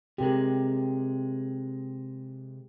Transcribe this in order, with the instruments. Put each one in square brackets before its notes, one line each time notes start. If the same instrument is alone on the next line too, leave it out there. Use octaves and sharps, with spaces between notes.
[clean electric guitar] C3 G#3 [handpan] G4 A#4